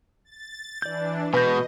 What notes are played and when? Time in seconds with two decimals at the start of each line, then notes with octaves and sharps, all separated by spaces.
0.25 A6
0.82 E3 D4 D5 G6
1.34 B2 G#3 B4 D#5 F#5 G#5 G6